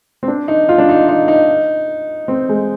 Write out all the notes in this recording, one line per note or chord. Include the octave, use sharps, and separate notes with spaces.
C4
D4
D#4
F4
D4
D#4
D#4
D#4
C4
G#3